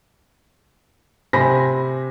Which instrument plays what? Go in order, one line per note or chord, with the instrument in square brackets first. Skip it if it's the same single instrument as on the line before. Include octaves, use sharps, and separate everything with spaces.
[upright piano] C3 C5 G#5 B5 A#6 B6